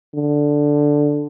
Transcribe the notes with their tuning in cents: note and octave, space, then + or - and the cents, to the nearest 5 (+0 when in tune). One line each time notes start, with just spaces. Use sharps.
D3 +0